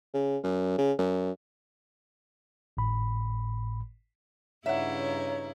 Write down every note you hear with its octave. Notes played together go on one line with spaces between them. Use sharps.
C#3
F#2
C#3
F#2
G#1 A2 B5
G2 C#3 D#4 E4 C#5 E5 F#5